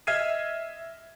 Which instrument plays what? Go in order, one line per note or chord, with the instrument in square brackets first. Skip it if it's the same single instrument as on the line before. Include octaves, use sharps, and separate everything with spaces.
[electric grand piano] D#5 E5 F6 G#6 C7 D#7